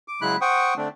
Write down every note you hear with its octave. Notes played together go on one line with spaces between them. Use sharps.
D6
C#3 F#3 G#3 E4 B5 F#6
C5 F#5 G5 C#6 D#6
D3 A3 C4 D4